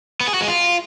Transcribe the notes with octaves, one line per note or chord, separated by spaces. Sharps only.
B3
G#4
F#4
G#3
F4